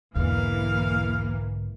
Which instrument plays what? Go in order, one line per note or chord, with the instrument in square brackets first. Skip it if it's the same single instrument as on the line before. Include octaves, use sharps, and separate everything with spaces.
[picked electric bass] B1 G#2 D3 [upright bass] E2 [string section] E3 A#3 [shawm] F5